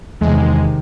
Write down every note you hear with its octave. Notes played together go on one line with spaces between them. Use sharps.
E2 C3 D#3 G#3